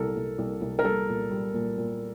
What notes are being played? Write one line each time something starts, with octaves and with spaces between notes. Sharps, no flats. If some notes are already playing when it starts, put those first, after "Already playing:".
Already playing: C2 A#2 A4 A#4
C2
C2
C2
A#4
G3 A4
A#2
G3
A#2
A#2